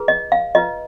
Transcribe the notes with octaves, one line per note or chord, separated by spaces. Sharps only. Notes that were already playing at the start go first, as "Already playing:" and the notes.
Already playing: F4 G#4 B4
D#5
F5
F4 B4 D#5